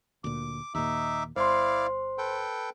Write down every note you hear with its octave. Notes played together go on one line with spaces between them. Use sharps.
D2 A#2 D6
D#2 A#2 D#4 E5 D6
G1 E4 C5 D5 F5 C6
A4 B4 G5